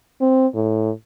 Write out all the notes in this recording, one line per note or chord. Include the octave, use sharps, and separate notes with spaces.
C4
A2